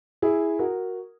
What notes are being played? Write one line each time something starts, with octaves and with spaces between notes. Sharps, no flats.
E4 G#4
F#4 A#4